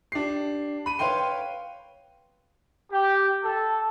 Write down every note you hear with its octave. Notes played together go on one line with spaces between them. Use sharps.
D4 G4 C7
B5 D#7
B4 C#5 F5 G5 C6
G4
A4